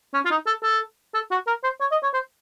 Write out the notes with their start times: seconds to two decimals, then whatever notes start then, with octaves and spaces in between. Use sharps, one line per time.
0.14 C#4
0.25 F4
0.31 D#4
0.46 A4
0.63 A4
1.14 A4
1.31 F#4
1.47 A#4
1.64 C5
1.80 C#5
1.92 D#5
2.03 C#5
2.14 C5